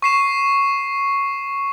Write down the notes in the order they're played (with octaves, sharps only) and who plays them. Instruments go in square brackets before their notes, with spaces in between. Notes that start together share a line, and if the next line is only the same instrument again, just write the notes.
[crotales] C#6 C7 E7